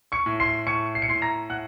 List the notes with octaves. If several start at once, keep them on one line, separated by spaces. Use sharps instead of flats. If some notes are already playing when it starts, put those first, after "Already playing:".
C#6 C#7
A2
C6 C7
A2 C#6 C#7
C7
C#7
A2 C6 C7
A#5 A#6
A2 F#5 F#6